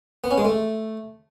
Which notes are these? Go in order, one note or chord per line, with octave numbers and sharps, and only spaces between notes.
B3
C#4
G#3
A3